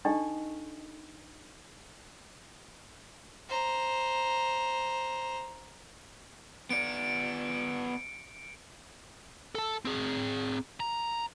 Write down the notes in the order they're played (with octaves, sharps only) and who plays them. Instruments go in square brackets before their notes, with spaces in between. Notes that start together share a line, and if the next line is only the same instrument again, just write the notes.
[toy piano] D4 D#4 A4 D#5 G5 C#6
[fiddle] C5 A#5
[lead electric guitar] B3 D5 [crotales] C#7 D7
[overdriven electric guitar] A4 A5
C4 G#4
A#5